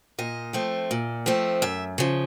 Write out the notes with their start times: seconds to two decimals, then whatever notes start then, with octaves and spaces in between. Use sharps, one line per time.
0.19 A#2 D#5
0.53 F3 A3 C4
0.91 A#2
1.26 F3 A3 C4
1.62 F#2 E5
1.98 C#3 F3